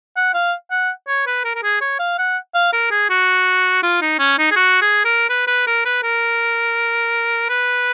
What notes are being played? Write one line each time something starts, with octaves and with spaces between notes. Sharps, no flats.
F#5
F5
F#5
C#5
B4
A#4
A#4
G#4
C#5
F5
F#5
F5
A#4
G#4
F#4
F4
D#4
C#4
D#4
G#4
F#4
G#4
A#4
B4
B4
A#4
B4
A#4
B4